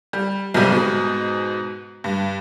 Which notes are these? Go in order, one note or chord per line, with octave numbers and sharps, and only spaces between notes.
G3
B1 G#2 C3 G3
G#2 B2
G2